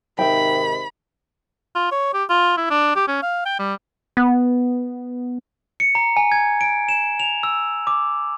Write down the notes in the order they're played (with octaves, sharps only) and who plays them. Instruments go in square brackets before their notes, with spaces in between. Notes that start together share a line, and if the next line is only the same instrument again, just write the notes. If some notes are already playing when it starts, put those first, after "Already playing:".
[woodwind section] G#2 C3 D#3 [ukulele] E5 G5 [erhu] B5
[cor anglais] F4
C#5
G4
F4
E4
D4
G4
C#4
F5
G5
G3
[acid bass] B3
[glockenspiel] C#7
A#5
G#5
G#6
D7
E7
F7
E6
D6